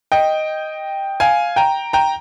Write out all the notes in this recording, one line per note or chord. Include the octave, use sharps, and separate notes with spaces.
D#5 G5
F5 G#5
G5 A#5
G5 A#5